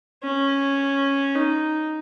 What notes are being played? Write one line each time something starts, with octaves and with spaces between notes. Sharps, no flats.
C#4
D#4